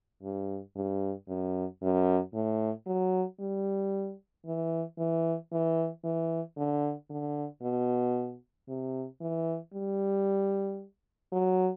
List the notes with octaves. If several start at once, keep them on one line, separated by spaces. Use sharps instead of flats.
G2
G2
F#2
F#2
A2
F#3
G3
E3
E3
E3
E3
D3
D3
B2
C3
E3
G3
F#3